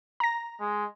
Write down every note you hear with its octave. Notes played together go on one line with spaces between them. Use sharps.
A#5 A#6
G#3